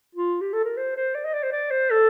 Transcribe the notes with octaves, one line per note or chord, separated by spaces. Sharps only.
F4
G4
A4
A#4
C5
C5
D5
D#5
D5
C5
D5
C5
A4